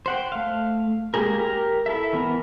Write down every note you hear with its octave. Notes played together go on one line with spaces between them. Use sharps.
C5 F#5 G5
A3 F5
G#3 A#3 G4 G#4 A#4
G4 A#4 A#5
E4 A4 E5
E3 B3 A#4